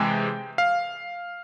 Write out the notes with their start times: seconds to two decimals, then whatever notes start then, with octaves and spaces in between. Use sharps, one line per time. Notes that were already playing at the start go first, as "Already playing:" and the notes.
Already playing: C3 E3 G#3 G5
0.58 F5